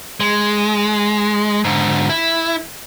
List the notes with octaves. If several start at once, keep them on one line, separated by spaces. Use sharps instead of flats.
G#3
G#2 D3
E4